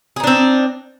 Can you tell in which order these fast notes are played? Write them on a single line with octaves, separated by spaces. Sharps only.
G#4 D#4 D4 C4